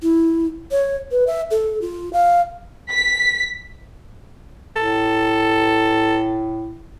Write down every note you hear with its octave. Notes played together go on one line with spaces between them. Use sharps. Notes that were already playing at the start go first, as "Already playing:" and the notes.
E4
C#5
B4
E5
A4
F4
F5
B6
A2 A4